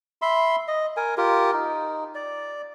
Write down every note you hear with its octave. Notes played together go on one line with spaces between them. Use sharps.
E5 B5 C6
D#5
A#4 G#5
F4 G4 A#4
D#4
D5